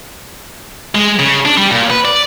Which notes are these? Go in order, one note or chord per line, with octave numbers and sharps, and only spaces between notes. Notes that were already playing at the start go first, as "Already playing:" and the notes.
G#3
C#3
D4
G3
A#2
B4
D5